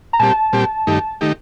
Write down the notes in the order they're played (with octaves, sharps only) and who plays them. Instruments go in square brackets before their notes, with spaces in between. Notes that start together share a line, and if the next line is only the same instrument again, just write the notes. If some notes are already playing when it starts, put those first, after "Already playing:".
[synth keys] A#5
[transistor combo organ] A#2 G3 C4 G4 [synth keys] A5
[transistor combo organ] A#2 G3 C4 G4
G2 D#3 A3 D#4 G4
D#3 A3 D#4 G4